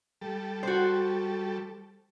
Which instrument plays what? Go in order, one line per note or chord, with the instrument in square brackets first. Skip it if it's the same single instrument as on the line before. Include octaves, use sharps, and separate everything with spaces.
[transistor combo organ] G3 A4
[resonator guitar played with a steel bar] F#4 C5